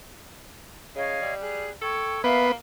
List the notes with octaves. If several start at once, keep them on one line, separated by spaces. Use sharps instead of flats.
C#3 C#5 D#5 F5
G3
G#4 F#6
A4 G5 C#6 G#6
A#3 B3 B4 E5 F5